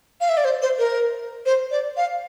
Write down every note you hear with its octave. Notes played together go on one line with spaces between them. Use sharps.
F5
E5
D5
C5
C5
A#4
C5
D5
F5